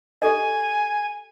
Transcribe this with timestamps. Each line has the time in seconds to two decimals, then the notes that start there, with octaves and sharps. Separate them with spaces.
0.22 G4 A4 D#5 G#5